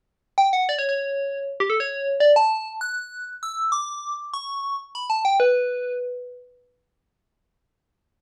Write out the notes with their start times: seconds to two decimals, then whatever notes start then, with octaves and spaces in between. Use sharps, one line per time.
0.38 G5
0.53 F#5
0.69 D5
0.79 C#5
0.89 C#5
1.60 G4
1.70 A4
1.80 C#5
2.20 D5
2.36 A5
2.81 F#6
3.43 E6
3.72 D6
4.34 C#6
4.95 B5
5.10 A5
5.25 G5
5.40 B4